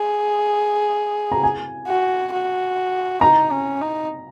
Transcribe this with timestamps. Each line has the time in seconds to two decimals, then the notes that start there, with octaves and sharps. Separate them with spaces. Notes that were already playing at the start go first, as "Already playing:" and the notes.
Already playing: G#4
1.32 A#5
1.43 G#5
1.87 F#4
2.33 F#4
3.21 D#4 A#5
3.51 C#4
3.81 D#4